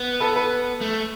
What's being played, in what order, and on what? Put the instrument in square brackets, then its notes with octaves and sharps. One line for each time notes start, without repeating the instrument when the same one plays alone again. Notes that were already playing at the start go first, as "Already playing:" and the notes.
Already playing: [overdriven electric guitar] B3
[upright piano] A4 B4
A4 B4
[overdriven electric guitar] A3